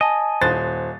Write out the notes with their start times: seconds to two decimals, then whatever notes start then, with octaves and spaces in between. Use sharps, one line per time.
0.01 D#5 G#5 A5
0.42 D#1 C5 F#6 A6